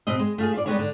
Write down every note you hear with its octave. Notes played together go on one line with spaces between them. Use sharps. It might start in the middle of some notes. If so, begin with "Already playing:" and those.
B2 C4 D#5
G#3
A3 F4 G#4
F4 D5
G3 G#3 B3 A4 A#4 C#5
D3